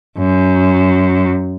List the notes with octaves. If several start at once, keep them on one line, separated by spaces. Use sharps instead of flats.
F#2